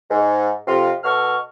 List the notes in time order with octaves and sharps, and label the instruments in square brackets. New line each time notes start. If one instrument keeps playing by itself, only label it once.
[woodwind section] G#2
F2 C3 F4
B2 A4 C#6 F6